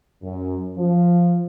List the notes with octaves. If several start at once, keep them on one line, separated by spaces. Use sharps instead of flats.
F#2
F3